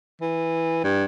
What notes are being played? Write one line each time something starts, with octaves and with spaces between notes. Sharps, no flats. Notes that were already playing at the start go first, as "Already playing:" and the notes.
E3
G2